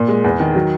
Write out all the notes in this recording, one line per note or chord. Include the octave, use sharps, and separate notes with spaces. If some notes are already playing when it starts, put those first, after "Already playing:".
Already playing: A#2
G#3
E2
D#3
F#3